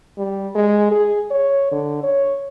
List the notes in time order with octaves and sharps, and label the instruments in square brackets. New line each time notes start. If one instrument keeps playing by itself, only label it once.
[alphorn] G3
G#3
G#4
C#5
D3
C#5